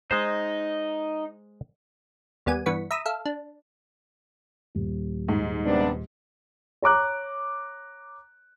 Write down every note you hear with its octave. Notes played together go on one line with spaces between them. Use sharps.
G#3 D#4 C5
D#2 G3 B3 G#5 D#7
G2 E3 B3 C#6 B6
E5 A#5 B5 D#6 E6
A4 E5 F5
D4
D#1
G#2
C3 B3 D4
C#5 A#5 D6 F#6